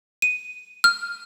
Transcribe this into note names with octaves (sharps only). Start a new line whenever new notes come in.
D#7
F6